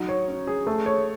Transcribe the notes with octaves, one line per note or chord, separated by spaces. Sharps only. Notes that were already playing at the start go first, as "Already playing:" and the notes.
Already playing: F#3 D#4
C#5
C#4
G#4
A3
C#5